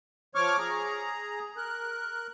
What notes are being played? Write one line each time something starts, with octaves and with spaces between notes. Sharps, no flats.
F3 C#5 C#6 D6 F6
G#4 A#5
A#4 F#6